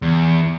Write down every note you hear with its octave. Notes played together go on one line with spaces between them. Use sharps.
E2